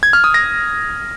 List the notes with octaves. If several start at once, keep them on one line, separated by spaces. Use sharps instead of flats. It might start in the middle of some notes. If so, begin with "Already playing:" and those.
G#6
F6
D#6
A#6